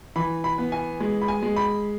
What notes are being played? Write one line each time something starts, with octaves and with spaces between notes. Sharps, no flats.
E3 B5
B5
B3
G#5
G#3
B5
G#5
G#3
B5